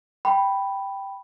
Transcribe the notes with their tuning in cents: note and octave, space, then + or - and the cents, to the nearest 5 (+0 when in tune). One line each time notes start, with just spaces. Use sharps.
G5 +0 B5 +0